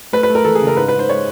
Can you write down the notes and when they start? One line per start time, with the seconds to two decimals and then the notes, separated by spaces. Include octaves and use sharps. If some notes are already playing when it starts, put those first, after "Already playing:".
0.13 A3 B4
0.23 B4
0.30 A3
0.35 A#4
0.45 E3 A4
0.55 G#4
0.61 C#3
0.67 A#4
0.77 G#2 B4
0.88 B4
0.94 G#2
0.99 C5
1.09 G#3 C#5